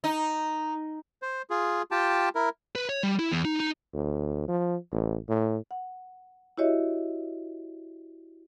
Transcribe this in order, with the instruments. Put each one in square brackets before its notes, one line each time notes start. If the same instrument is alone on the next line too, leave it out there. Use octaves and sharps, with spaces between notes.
[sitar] D#4
[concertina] C5
F4 G#4
F4 G4 G5 A5
E4 A#4
[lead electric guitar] B4
C#5
G3
E4
E2
D#4
D#4
[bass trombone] D2
F3
A1
A2
[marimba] F#5
E4 F#4 G4 C#5 D#5 E5